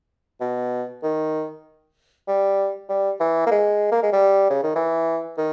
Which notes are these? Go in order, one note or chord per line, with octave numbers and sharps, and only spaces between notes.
B2
D#3
G3
G3
E3
A#3
G#3
A#3
G#3
G3
C#3
D#3
E3
D#3